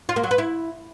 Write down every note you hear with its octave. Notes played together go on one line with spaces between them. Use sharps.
F4
A#3
F#3
B4
E4